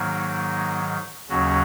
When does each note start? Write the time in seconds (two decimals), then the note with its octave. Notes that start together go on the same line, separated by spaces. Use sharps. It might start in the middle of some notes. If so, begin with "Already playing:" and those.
Already playing: G#2 D#3 F#3 A#3 D#4
1.29 D#2 C#3 F#3 C#4 F#4